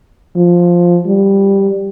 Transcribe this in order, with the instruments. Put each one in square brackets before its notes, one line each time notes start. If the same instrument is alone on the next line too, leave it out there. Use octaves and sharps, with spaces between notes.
[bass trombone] F3
G3